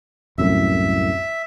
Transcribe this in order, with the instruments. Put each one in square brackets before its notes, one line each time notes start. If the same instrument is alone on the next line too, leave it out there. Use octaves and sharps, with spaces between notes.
[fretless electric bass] C2 F#2 A2 [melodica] E5